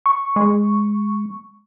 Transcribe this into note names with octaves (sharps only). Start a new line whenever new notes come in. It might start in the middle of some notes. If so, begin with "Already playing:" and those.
C#6
G#3